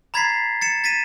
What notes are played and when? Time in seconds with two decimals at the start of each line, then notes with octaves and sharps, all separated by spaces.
0.14 A#5 B5 G#6 A6 B6 C7
0.61 A6 C#7 E7
0.84 A6 B6 D#7 E7